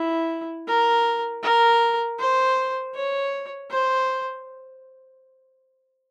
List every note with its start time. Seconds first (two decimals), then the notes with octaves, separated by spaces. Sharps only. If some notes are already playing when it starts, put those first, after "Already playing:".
Already playing: E4
0.67 A#4
1.43 A#4
2.19 C5
2.95 C#5
3.70 C5